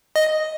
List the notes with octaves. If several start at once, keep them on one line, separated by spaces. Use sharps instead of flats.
D#5